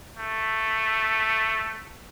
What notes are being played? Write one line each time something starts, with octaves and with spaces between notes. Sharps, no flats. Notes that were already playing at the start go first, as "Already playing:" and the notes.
A3